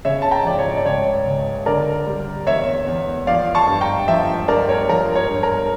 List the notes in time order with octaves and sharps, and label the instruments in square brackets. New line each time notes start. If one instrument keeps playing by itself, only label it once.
[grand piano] C#3 C#5 E5
A5
G5 A#5
F3 D5
C#5
D5
C#2 C#5
C#2
D3 A#4 D5
G3
E2 C#5 E5
E2
F3 D5 F5
A5 C#6
G2
G5 A#5
F3 E5 G5
G2 A#4 D5
C#5
F3 A#4
C#5
G2
A#4